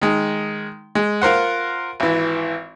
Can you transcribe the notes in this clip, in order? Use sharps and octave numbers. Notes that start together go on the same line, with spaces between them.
D#3 G#3
G#3
F4 A#4 C5 F#5
G#1 E3